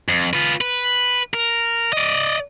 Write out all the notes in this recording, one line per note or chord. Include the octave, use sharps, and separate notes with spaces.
F2
F4 B4
B4
A#4
D5 D#5